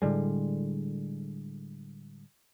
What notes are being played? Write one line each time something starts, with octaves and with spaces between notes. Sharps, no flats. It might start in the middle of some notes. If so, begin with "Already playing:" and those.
A2 D3 G3 G#3